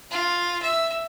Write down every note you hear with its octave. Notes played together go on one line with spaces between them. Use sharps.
F4
E5